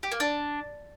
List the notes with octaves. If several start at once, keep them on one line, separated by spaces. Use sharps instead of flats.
G4
A#3
D4